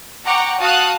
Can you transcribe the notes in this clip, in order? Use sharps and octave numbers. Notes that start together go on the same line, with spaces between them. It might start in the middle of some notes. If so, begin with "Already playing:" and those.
F#5 G5 A#5 C#6 D6
F#4 F5 A5 D#6 F#6